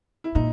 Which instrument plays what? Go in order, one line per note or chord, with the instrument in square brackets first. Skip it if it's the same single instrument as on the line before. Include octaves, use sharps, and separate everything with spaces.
[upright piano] E4
[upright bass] A#2 [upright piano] D#4